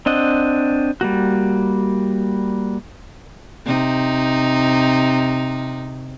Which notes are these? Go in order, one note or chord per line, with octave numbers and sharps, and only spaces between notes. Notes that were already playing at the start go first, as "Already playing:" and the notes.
C4 D4 D#5 F#5
G3 A#3 F#4
C3 D#4